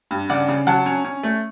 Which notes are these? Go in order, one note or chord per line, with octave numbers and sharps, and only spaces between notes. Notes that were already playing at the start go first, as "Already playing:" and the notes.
G2
C#3 D5 F#5
C#3
F#3 F#5 A5
C#4
C#4
A3